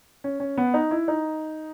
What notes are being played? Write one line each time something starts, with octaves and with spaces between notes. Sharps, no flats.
C#4
C#4
B3
D#4
E4
D#4